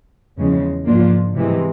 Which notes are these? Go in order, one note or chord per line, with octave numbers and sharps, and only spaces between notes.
E2 C#3 F3 G#3
G#2 F3 A#3 D4 F4
C3 E3 G#3